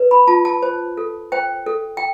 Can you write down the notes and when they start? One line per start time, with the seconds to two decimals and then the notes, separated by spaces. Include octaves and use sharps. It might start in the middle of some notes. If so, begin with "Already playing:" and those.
Already playing: B4
0.11 B5
0.28 F4 A5
0.45 A5
0.62 C5
0.97 A4
1.32 C5 G5
1.66 A4
1.97 G5